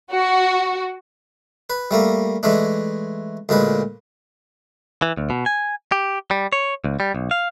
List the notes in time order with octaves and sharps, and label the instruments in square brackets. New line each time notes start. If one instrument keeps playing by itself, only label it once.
[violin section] F#4
[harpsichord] B4
G3 A3 A#3
E3 G#3 A3 D4
D2 A#2 G#3 B4
[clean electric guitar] E3
D2
B2
G#5
G4
G3
C#5
C#2
G3
B1
F5